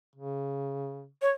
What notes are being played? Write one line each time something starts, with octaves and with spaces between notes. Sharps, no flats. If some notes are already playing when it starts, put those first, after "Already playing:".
C#3
C#5